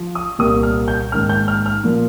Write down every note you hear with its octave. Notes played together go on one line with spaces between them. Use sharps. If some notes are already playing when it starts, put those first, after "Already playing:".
Already playing: F3
D#6
C2 A#2 G3 A#3 D#6
F6
G6
G#2 D#3 A#3 F6
G6
F6
F6
A#2 F3 A#3